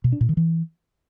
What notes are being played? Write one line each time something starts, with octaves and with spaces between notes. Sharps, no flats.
B2
D4
A#2
D#3
E3